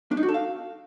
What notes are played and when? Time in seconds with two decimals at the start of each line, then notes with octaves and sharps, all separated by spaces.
0.11 D4
0.17 D#4
0.23 F#4
0.29 A4
0.34 F5